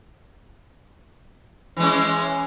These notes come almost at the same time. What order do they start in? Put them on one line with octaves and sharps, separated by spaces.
E3 G#3 C#4